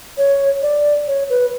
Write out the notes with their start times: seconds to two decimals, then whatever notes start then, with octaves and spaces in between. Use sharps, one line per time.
0.17 C#5
0.62 D5
1.07 C#5
1.30 B4